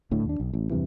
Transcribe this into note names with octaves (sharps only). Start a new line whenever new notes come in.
D1 A2 D3
D#2 D4
B1
A1
E2 G2 C3 E3